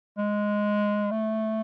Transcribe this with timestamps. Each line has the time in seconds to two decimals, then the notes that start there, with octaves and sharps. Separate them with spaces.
0.18 G#3
1.11 A3